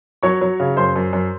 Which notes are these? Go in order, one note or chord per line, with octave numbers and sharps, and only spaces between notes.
F#3 C#5 C#6
F#3
C#3
F#2 C5 C6
F#2
F#2